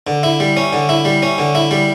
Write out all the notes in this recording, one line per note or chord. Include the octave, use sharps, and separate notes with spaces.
D3
E4
G3
C#4
D3
E4
G3
C#4
D3
E4
G3